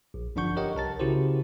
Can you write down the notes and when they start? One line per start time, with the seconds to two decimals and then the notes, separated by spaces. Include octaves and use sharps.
0.14 A#1
0.36 G1 F3 D4 F#5 C#6 G6
0.57 G4 A#4 C#5 D#5 F#5 G5
0.75 C2 A#4 A5 A6
1.00 C#3 E4 F#4 G4 C5